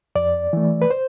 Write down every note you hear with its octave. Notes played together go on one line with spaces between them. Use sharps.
F2 D5
E3 A3
B4
C5